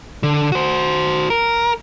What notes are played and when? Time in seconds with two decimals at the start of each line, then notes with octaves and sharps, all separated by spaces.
0.23 D3
0.52 F#4 C5
1.30 A#4